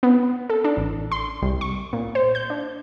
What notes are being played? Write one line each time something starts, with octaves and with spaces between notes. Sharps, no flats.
B3
A4
D4
A1
C6
C2
C#6
A#2
C5
G6
D4